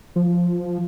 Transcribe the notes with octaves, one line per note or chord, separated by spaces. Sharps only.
F3